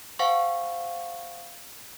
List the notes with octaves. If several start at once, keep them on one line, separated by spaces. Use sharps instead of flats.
C5 F5 F#5 G#5 C#6